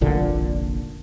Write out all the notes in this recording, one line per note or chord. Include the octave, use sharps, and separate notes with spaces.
F1 A#1 A#2 D3